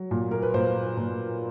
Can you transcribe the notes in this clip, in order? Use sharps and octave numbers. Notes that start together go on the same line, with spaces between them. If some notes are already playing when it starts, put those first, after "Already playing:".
Already playing: F#3
A#2
A#4
B4
A#2 C5
A#2